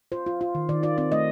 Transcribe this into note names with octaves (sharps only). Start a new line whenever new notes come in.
F4 C5
F4
F4
D#3
D#3 D5
F4 D5
C4 D5
A3 D#5